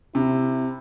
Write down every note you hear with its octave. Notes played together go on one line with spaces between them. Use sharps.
C3 E4